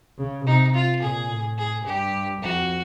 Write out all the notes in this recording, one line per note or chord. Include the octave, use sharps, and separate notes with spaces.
C#3
C3 D#4
F4
A#2 G#4
A2
G#4
G2 G4
F2 F#4